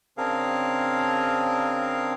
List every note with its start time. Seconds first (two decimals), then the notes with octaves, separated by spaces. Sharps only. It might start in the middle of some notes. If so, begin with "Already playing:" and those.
0.18 C#3 C4 D4 G#4 A#4 F5